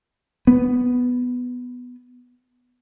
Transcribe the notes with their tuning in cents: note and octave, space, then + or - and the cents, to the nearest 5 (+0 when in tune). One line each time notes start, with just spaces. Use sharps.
B3 +5